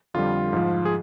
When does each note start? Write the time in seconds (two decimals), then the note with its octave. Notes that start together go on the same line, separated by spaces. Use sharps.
0.14 F2 D3 G3 F4
0.53 G#2 F3
0.85 G#4